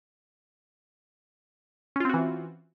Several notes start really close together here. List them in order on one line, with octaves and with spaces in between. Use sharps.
C#4 F4 C4 F#4 E3